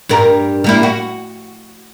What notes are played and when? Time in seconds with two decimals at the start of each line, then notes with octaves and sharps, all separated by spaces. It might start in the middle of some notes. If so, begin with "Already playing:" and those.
0.09 G2 G3 A#4
0.64 G3 A#3 E4
0.83 F#4